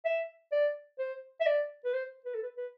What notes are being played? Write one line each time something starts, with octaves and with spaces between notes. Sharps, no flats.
E5
D5
C5
E5
D5
B4
C5
B4
A4
B4
B4